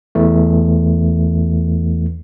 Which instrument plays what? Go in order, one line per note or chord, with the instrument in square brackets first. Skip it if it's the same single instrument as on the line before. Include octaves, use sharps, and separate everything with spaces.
[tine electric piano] E2 E3 A3